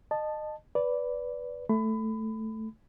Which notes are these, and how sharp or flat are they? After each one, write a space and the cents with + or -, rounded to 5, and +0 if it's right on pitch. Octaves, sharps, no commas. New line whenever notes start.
D#5 -25 A5 +0
B4 +0 D5 -15
A3 +0 B5 +25